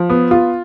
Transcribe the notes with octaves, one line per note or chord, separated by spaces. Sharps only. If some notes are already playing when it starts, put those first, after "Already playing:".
Already playing: F3
B3
F4